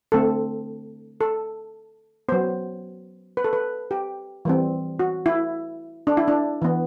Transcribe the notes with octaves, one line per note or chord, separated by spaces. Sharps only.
D3 A3 C4 A4
A4
F#3 B3 C5
B4
A4
B4
G4
E3 G3 C4
F#4
E4
D4
E4
D4
E3 B3